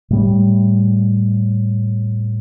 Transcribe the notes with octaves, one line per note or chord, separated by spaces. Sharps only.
A2 G3